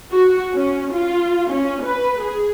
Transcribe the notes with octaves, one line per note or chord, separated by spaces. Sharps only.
F#4
C#4
F4
C#4
B4
G#4